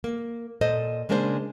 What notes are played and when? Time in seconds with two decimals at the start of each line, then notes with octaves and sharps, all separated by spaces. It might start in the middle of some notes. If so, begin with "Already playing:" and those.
0.04 A#3
0.61 A#2 A4 C5 D#5
1.09 C#3 G#3 A#3 D4 E4 C5